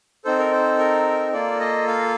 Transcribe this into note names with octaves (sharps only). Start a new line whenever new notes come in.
C4 D#4 A4 C5
A#4
C5
A#4
A#3 F4 A4 D5
D#5
F5